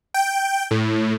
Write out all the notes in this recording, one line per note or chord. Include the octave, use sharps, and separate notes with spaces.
G5
A2